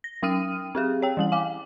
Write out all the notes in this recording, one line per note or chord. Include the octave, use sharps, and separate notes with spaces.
A#6
F#3 C#4 G5 D#6 F6 D#7
C4 G4 G#4
C#5 G5
E3 G3 F#7
F5 G#5 D6